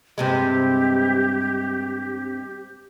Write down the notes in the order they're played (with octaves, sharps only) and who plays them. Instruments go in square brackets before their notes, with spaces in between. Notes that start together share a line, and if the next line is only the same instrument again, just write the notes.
[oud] G2 C3 G#3 [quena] G4